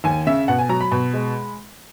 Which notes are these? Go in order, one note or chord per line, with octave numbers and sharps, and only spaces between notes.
D#2 G#5
C#3 E5
B2 F#5
G#5
F#3 A#5
B5
B2
G#3